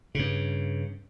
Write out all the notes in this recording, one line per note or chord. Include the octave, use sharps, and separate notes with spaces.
G2 C#3